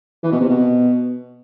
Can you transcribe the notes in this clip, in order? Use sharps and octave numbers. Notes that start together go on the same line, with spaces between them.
E3
B2
C3
B2